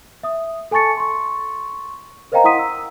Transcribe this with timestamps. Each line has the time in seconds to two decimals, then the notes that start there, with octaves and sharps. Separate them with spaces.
0.23 E5 D#6
0.71 A4 G#5 A5 C#6 A6 C#7
0.97 C6 C#6
2.32 A#4 C5 D#5 F5 G5 A#5
2.44 E4 F#5 C6 D#6 B6 D#7
2.59 E6